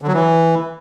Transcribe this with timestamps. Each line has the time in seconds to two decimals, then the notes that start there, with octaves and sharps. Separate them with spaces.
0.02 D3
0.07 F#3
0.13 E3